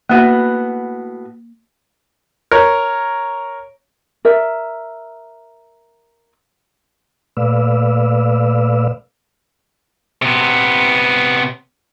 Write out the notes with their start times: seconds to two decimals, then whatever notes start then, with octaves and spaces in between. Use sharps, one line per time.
0.10 A2 A#3 B3 F#4 E5 F#5
2.51 A#4 C#5
4.25 A#4 D5 E5
7.37 A#2 A3 B4 D5 F5 E6
10.22 C3 B3